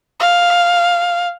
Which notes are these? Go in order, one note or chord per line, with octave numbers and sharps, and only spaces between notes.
F5